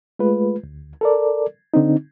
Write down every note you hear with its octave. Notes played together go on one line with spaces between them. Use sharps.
G#3 A3 F4 B4
D2
A4 A#4 D5
D3 C4 D#4